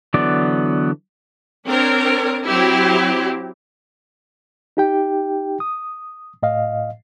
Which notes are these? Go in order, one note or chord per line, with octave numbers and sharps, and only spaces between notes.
D3 E3 F#3 B3 D5
C4 D4 A#4 C#5
F#3 C4 E4 G4
D#4 G4 G5
D#6
A2 D#5 F5